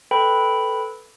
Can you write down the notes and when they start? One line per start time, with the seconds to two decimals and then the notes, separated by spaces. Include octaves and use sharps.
0.11 A4 B4 G5 B5